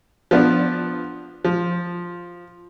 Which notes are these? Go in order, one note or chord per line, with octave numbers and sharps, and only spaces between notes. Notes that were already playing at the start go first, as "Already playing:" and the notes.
F3 B3 D4
F3